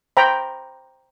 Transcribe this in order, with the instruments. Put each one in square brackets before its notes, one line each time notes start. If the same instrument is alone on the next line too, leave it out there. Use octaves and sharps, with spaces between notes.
[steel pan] C5 G5 A#5 B5